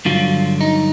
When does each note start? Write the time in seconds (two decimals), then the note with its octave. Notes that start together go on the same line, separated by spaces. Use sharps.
0.05 G2 D3 F#3 F4
0.61 D#4